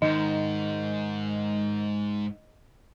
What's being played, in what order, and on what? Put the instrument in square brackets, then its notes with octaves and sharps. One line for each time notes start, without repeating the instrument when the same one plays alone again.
[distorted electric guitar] G#2 [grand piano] D#3 [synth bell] D#5